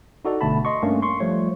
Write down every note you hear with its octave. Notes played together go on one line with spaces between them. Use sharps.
D#4 F#4 A4 D5
G1 B2 D3 A3 A5 B5
D#5 C6 C#6
G2 A3 A#3 C#4 D4
C6 C#6
F3 G3 A3 F4 C#5